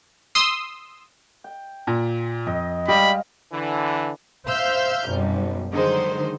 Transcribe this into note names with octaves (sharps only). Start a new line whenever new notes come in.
C6 D#6 E6
G5
A#2
F2 D#5
G3 G#3 G4 D#5 F5 B5
D3 E3
C5 E5 F5 E6 F6 G6
G#1 F#2 B2 G3
D3 D#3 F#3 G#3 D#4 C5